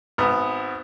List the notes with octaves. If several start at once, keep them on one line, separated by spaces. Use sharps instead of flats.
G#1 B3